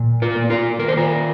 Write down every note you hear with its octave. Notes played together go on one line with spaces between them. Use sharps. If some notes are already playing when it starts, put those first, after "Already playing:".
Already playing: A#2
F4 A#4
A#3
F4 A#4
D#3 A#4
C5
F4 A#4